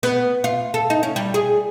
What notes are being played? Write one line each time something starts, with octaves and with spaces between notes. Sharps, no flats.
B3
F4
A4
D#4
C#4
G3
G#4